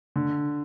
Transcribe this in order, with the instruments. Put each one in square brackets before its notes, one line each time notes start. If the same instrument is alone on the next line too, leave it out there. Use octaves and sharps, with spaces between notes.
[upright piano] D3